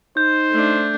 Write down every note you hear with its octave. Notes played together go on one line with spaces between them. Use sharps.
D#4 C5 G6
A3 D4